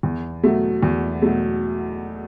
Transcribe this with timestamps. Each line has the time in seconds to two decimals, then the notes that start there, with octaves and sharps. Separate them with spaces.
0.03 E2
0.43 B2 F#3 A3
0.83 E2
1.22 B2 F#3 A3